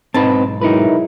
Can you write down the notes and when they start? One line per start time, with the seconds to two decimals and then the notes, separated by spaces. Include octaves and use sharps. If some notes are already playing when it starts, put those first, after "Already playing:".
0.14 B1 G#2 C4 D#4 B4 A5
0.62 F#3 G#3 D#4 E4 A#4 B4